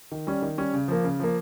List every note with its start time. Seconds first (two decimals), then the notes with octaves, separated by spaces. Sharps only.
0.12 D#3
0.27 G3 C#4
0.42 D#3
0.58 G3 C#4
0.73 C#3
0.88 F3 A#3
1.04 C#3
1.19 F3 A#3